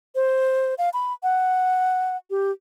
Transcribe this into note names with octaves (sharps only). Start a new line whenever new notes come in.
C5
F5
B5
F#5
G4